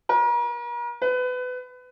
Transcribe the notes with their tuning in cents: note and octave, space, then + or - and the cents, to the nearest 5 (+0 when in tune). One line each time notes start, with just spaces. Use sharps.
A#4 +40
B4 +25